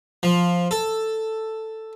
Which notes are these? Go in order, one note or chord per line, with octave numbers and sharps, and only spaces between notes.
F3
A4